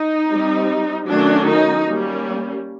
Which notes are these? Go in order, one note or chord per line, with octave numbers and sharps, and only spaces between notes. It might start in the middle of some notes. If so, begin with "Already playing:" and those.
Already playing: D#4
G3 C4
D#3 F#3 A3 C#4 D4
D#4
G3 A#3 C#4